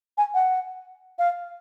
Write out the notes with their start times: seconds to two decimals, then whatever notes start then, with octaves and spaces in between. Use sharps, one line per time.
0.18 G#5
0.34 F#5
1.19 F5